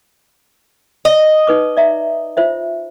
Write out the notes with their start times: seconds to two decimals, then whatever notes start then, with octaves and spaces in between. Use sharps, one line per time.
1.05 D#5
1.47 D#4 B4 D6
1.77 D5 E5 A#5
2.37 F4 C5 E5